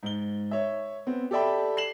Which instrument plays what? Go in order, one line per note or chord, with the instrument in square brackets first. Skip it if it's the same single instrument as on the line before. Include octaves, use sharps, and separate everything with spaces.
[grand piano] G#2 G7
C#5 E5
B3 C4
G4 A4 D5 E5 G5 B5
C7 E7 F#7